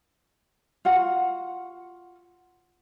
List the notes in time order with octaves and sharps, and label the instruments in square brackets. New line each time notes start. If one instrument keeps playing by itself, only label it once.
[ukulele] F4 F#4 F#5